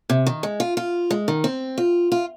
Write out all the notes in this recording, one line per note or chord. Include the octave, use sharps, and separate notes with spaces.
C3
D#3
G#3
F4
F4
G#3
D#3
C4
F4
F4